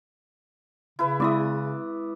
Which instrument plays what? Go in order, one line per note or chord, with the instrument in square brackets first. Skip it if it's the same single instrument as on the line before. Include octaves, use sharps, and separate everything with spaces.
[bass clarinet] C#3 [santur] E4 B4
[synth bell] G#3 E4 [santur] D5 E5 D#6